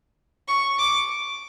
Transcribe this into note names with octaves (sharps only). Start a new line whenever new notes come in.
C#6
D6